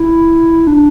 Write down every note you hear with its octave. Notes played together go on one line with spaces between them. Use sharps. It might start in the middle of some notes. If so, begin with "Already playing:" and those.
Already playing: E4
D4